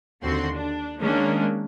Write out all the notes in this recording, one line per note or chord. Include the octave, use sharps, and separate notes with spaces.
D#2 D3 C4 F#4 C6
D4
D#3 G#3 A#3 C#4 D4